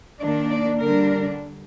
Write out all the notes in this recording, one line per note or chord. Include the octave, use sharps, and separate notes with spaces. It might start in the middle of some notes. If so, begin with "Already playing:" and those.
D#3 A#3 D4 D5
D5
D3 G3 D4 A#4